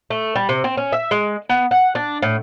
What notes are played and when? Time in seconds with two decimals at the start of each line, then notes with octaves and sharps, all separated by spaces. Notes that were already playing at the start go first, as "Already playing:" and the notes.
0.10 A3
0.35 G3
0.49 C3
0.64 C4
0.77 C#4
0.93 E5
1.11 G#3
1.49 B3
1.71 F#5
1.95 D4
2.22 A2